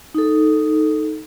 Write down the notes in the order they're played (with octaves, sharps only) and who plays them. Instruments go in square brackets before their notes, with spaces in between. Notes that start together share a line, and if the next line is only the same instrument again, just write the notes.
[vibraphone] D#4 A4